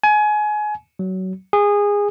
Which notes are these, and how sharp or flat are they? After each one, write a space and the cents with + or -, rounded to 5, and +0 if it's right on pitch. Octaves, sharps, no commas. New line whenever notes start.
G#5 +25
F#3 +20
G#4 -20